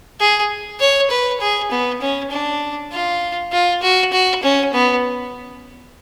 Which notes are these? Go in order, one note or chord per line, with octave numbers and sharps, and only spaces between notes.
G#4
C#5
B4
G#4
B3
C#4
D4
F4
F4
F#4
F#4
C#4
B3